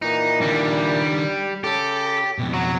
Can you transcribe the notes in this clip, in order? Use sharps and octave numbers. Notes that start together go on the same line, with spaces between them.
A#2 E3 D#4
D#3 G3 D4
C#3 G4 A4
F2 B2
F#3 F#4